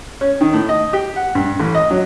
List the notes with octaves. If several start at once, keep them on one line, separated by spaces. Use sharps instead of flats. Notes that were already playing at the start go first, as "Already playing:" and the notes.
C#4
D#3
A2
D#5
G4
F#5
G2
A1
D#5
F#3